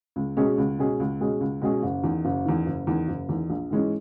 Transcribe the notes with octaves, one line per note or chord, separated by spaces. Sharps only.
C#2
B2 G#3 C#4 G#4
C#2
B2 G#3 C#4 G#4
C#2
B2 G#3 C#4 G#4
C#2
B2 G#3 C#4 G#4
F#1
E2 D#3
F#1
E2 D#3
F#1
E2 D#3
F#1
E2 D#3
A#1
G#2 E3 G#3 C#4